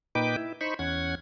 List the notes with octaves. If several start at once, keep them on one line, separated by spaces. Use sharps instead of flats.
A#2 D#4 B4 G5 D6
E4
D#4 C5 B5 C#6
E2 C#4 F#5 G#6